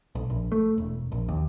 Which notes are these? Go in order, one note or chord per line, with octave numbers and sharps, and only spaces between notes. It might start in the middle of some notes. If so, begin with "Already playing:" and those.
B1
A#1
A3
E1
A#1
D#2